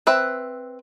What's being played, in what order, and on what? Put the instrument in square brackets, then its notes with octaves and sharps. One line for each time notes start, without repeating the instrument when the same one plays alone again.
[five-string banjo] C4 B4 E5